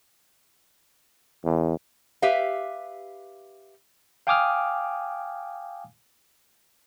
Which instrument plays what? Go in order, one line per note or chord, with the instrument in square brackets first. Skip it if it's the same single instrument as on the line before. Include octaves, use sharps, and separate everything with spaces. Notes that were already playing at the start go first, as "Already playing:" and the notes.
[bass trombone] E2
[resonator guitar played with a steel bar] G4 B4 E5 F5
[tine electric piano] F5 G5 G#5 D6 D#6 F6